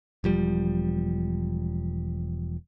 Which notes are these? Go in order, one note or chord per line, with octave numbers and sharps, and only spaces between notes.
E1 F3 G3